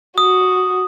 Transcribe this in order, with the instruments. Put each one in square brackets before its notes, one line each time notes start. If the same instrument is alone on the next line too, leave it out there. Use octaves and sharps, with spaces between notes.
[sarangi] F#4 [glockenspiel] D#6